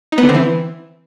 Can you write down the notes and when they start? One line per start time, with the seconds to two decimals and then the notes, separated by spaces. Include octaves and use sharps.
0.12 D#4
0.18 B3
0.23 D3
0.29 C4
0.34 E3